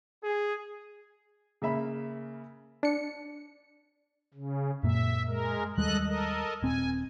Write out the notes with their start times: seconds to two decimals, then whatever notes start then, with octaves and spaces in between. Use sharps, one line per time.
0.24 G#4
1.62 C#3 A#3 E5 B5
2.83 D4 C#7
4.34 C#3
4.84 F#2 A#2 A#3 E5
5.28 G#3 A#4
5.78 D#2 G3 G#3 A4 D#5 F#6
6.07 A4 A#4 D#5
6.63 D#1 C4 G#5